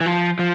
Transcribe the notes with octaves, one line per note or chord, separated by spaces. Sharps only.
E3
F3
F3